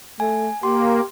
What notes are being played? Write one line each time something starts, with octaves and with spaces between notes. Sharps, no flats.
A3 G#5
A#3 G4 C6